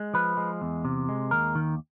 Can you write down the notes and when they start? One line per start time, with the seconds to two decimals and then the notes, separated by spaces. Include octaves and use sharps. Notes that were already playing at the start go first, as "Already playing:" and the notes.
Already playing: G#3
0.14 F3 B4
0.37 G#3
0.61 E2
0.85 C3
1.09 G#3
1.31 D#2 A#4
1.55 D#3